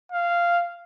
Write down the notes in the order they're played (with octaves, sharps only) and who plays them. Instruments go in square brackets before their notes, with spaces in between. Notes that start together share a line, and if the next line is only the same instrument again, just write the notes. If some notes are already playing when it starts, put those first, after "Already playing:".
[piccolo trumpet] F5